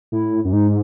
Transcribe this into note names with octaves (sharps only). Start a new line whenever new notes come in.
A2 E4
F#2
G#2 D#4